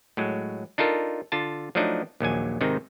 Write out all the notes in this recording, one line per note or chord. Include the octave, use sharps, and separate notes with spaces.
A2 F#3 G#3
D4 D#4 F4 A4 A#4
D3 F4 A5
F3 F#3 A3 D4 D#4
A#1 D#2 F#3 G#5
G#2 C3 D#3 C4 D#4